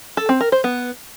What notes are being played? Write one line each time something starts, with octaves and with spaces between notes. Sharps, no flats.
A4
C4
A#4
C5
B3